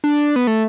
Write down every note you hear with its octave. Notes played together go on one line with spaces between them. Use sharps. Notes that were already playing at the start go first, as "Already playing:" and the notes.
D4
B3
A3